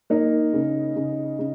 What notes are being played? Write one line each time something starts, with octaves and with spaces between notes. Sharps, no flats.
A#3 D#4
C#3
C#3
C#3